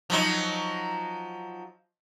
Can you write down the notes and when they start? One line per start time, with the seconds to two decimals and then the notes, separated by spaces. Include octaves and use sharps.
0.10 F3 F#3 D#4